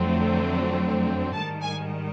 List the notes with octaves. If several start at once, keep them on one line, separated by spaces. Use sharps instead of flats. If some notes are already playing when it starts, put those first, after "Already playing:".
Already playing: F2 D3 F#3 A3 C4
G#2 D#3 G3 A5
G#5